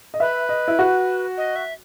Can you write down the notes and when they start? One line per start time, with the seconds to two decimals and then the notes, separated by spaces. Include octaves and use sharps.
0.14 D#5
0.20 B4 E5
0.49 D#5
0.68 E4
0.79 F#4
1.37 D#5
1.56 E5